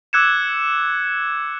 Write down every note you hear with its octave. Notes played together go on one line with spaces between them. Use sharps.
D6 E6 F#6 G#6 C#7 E7